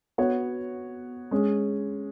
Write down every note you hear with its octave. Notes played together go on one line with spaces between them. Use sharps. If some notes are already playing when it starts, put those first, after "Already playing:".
B3 F#4 C#5
G#3 C#4 G#4